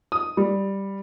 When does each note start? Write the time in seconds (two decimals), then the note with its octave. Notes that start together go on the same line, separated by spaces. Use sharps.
0.12 D#6
0.37 G3